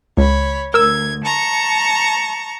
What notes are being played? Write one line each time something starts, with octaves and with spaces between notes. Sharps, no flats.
C#2 C#5 B5
D2 A#4 E6 G#6
A5 A#5 C#6